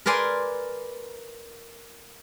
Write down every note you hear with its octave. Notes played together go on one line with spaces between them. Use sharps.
A#4 B4 D5 G#5 C6